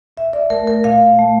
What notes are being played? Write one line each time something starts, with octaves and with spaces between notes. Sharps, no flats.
A#2 E5
D5
A3 A#4
A#4
A#2 F5
A3